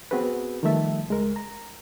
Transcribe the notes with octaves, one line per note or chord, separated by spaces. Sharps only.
B3 C4 F#4 G#4 B4
D#3 F3 G3 A3 E5 A5
C#2 G#3 A#4
A#5